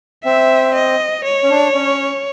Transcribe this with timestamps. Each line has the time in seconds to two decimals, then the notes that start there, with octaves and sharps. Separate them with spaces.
0.24 C4 E5
0.75 D#5
1.25 C#5
1.44 C#4
1.50 D4
1.75 C#4